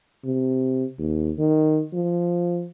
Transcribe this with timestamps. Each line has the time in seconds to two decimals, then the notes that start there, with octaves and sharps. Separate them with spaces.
0.25 C3
0.98 D#2
1.39 D#3
1.93 F3